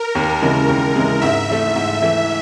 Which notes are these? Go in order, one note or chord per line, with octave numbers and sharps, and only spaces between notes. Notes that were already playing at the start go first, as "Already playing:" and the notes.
Already playing: A#4
D#2
C#3 E3 G#3
D#2
C#3 E3 G#3
G#2 E5
E3 A3
G#2 E5
E3 A3